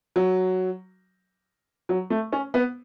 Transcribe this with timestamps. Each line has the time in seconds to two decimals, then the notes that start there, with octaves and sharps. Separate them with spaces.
0.16 F#3
1.89 F#3
2.10 A3
2.32 C#4
2.54 B3